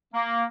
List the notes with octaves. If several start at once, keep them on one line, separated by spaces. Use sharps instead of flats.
A#3